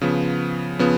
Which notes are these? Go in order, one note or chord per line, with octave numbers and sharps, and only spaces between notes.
C#3 F3 B3
C#3 F3 B3